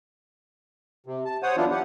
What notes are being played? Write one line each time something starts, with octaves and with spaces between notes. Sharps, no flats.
C3
A5
C5 C#5 F#5 D#6
E3 F#3 B3 D4 E4 F4
G4 F#5